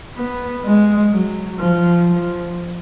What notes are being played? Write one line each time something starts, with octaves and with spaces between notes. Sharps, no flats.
B3
G#3
F#3
F3
F3